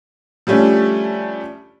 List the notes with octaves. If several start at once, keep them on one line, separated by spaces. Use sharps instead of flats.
F3 G3 A3 C#4 D4